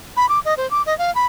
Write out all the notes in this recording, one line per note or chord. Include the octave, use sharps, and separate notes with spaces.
B5
D6
D#5
C5
D6
D#5
F5
B5